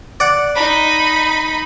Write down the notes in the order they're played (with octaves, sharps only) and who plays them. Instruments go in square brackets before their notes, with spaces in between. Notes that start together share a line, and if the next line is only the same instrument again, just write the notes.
[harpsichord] D5 F#5
[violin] D#4 B5